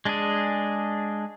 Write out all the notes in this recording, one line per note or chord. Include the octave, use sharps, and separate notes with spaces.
G#3 D4 G#4